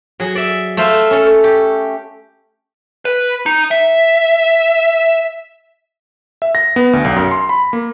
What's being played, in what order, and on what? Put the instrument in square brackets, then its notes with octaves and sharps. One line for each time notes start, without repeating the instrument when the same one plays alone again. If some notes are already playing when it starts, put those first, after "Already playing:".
[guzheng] F#3 G#4
D5 E5
A3 A4 C5 E5 F5
C#4 A4
G4
[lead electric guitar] B4
D#4
E5
[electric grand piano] E5
A#6
B3
D2
B1
F#2
C6
B5
A#3